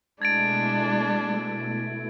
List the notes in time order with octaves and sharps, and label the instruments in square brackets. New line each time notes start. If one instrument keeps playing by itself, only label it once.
[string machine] B2 A3 E4 [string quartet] G#3 D4 [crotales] G#6 A6 D7